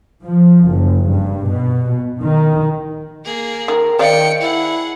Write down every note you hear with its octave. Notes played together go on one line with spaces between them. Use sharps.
F3
F#1
G2
B2
D#3
A#3 G#4
D#3 A#4
D#3 C5 D5 F5 G5 C#7
E4 G#4 F#5